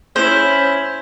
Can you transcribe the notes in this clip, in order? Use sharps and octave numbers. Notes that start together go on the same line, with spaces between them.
C#4 E4 C5 G6 E7